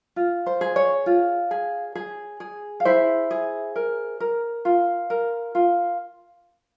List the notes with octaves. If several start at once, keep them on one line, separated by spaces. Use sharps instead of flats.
F4
C5
G#4
C#5
F4
G#4
G#4
G#4
F5
E4 C5 E5
G#4
A#4
A#4
F4
A#4
F4